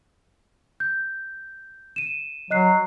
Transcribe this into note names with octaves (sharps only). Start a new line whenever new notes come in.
G6
D#7 E7
F#3 D#5 F#6 C7